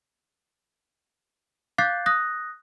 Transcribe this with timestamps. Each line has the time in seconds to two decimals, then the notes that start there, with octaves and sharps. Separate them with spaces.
1.78 F5 D6 F#6 G6 A6 C7
2.06 D#6 F#6 A#6